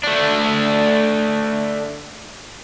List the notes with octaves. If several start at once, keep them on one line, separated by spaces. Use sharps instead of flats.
A3 D4